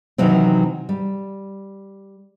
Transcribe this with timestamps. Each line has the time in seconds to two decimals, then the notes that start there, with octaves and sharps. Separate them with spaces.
0.18 C3 D#3 E3 F#3 C4
0.89 G3